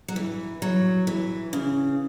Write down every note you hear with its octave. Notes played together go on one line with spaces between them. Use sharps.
F#3
E3
F#3
E3
C#3